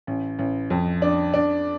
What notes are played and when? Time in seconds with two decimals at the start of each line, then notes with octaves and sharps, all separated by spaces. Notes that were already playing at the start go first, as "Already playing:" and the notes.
0.07 A1
0.39 A1
0.70 F2
1.02 D4
1.34 D4